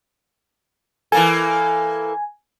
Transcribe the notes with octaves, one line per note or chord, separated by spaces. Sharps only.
E3 A#3 A4 G#5